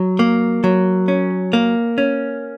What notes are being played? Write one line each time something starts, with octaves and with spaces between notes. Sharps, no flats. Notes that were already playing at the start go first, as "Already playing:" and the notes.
Already playing: F#3
A#3
F#3
C#4
A#3
C#4